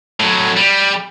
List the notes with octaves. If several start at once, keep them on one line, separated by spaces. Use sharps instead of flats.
A2 F#3
G3